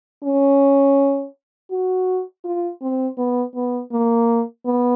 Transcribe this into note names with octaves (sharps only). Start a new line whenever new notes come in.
C#4
F#4
F4
C4
B3
B3
A#3
B3